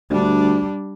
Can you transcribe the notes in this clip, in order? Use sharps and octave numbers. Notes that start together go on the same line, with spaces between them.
D2 G3 D4